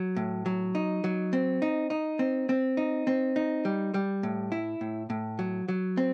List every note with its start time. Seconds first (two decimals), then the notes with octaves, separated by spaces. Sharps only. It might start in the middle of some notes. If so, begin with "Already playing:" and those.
Already playing: F#3
0.16 A2
0.46 F#3
0.75 D#4
1.04 F#3
1.33 C4
1.62 D#4
1.90 D#4
2.19 C4
2.49 C4
2.77 D#4
3.07 C4
3.36 D#4
3.65 G3
3.94 G3
4.23 A2
4.52 E4
4.81 A2
5.10 A2
5.39 F#3
5.68 F#3
5.97 C4